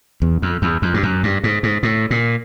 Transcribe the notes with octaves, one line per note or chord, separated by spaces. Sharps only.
E2
F2
E2
F2
G2
F#2
G2
G#2
G#2
A2
A#2